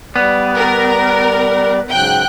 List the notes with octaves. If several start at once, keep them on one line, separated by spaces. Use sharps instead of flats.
G3 B3 D5
A#4
G#2 C#3 F#3 G5 F#6